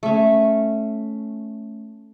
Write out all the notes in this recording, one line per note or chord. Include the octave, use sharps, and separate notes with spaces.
A3 C#4